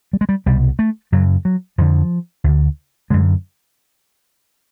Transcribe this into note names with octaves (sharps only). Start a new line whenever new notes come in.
G3
G#3
G3
C2 B2 G3
A3
F#2 C#3 F#3
F#3
F2 D3 F3
D2 D3
F#2 D3 G#3